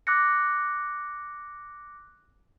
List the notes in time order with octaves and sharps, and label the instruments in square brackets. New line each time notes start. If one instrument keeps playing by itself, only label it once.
[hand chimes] D6 E6 F#6 A6 A#6 C#7